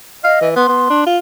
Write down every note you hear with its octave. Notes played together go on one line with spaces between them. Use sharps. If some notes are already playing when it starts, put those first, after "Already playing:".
D#5 F5
E3
B3 C6
B3
D4
F4